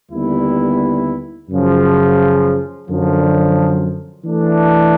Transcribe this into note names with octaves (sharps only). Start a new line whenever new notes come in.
D#2 D3 G3 B3 E4
F#2 C#3 F3
F#2 D3 F3
E3 A3 D4